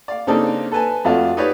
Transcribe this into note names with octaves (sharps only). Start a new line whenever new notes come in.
D5 F5
C#3 A#3 C4 D4 D#4 A4
A4 B4 G#5 A5
F2 A3 F4 F#4 D5
D#4 G4 B4 C#5 D5